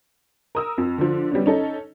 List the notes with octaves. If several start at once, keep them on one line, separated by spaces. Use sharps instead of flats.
A#4 D#6 E6
F2
D3 F3
G3 B3 C#4
C#4 D#4 A4